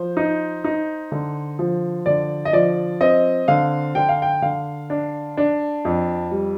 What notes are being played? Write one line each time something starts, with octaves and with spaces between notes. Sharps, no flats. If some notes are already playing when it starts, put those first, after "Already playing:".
Already playing: F3 C5
D#4
D#4
D3
F3
D3 D5
D#5
F3 D5
C4 D#5
D3 F5
D3 G5
F5
G5
D3 F5
D4
D4
F2
G3